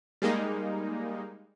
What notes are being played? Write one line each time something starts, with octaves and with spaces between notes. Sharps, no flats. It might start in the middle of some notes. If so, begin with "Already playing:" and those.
G3 G#3 A#3 D#4